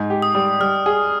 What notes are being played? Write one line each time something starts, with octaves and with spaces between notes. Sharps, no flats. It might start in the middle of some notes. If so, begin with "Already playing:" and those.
Already playing: G#2
G4
D#6
G3
G3 F6
G#4